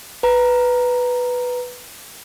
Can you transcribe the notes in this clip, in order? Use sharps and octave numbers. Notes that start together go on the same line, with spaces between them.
B4 A#5